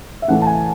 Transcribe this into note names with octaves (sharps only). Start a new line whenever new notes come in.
E5
A2 E3 A3 F#5
A5
G#5